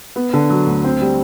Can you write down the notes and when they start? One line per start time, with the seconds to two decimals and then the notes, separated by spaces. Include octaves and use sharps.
0.16 B3
0.34 D3
0.50 F#3
0.67 D2
0.84 C4
1.01 G3